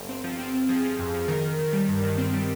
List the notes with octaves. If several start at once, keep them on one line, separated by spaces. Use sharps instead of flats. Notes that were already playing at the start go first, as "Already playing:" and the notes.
Already playing: G1
C4
F3
C4
C4
F3 G#4
F3
F2
F3
D#3 A#4
D#3
D#3
G3
G2
D#3
C4
G3